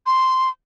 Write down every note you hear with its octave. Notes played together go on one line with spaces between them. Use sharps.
C6